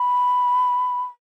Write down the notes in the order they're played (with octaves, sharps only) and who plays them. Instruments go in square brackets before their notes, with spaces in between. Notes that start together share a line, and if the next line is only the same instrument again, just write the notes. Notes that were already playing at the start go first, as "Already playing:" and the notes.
Already playing: [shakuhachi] B5